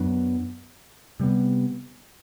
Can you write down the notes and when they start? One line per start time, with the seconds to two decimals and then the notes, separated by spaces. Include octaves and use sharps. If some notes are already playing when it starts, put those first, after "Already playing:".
Already playing: F#2 F#3 B3 D4
1.20 C3 G3 B3